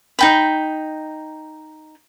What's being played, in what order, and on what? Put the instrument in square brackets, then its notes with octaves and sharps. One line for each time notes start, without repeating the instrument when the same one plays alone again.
[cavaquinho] D#4 G5 B5